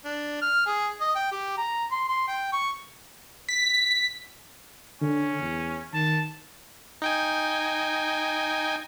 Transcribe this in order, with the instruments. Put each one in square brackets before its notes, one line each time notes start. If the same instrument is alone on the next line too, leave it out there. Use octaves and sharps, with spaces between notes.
[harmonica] D4
F6
G#4
D#5
G5
G4
A#5
C6
C6
G5
C#6
[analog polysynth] B6
[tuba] D3 [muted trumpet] C#4
[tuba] E2
[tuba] D#3 [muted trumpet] A5
[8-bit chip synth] D#4 G5 G#5